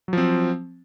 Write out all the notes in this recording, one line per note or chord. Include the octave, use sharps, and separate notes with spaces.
F3 F#3 C4